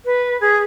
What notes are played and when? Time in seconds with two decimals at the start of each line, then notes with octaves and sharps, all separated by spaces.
0.05 B4
0.41 G#4